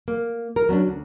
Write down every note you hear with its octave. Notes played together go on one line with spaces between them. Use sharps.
A#3
A#4
F#3 B3 C#4 D4
D2